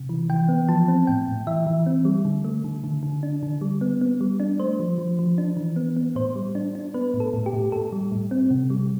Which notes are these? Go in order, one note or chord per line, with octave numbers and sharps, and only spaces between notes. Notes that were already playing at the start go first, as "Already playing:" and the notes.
Already playing: C3
E3
E3 G5
B3
F3 A5
C4
A2 G5
A2
E3 E5
E3
C4
G3
D3
A3
D3
D3
D3
D4
D3
G3
B3
B3
G3
D4
A3 C5
F3
F3
F3
D4
E3
B3
B3
A2 C5
G3
D4
D4
B3 B4
A2
A4
A2
G4
A2
A2 A4
G3
A2
C4
C3
G3